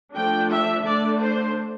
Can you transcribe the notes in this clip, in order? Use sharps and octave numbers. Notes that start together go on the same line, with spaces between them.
F3 A3 D4 G5
E5
D3 A3 D4 D5
C5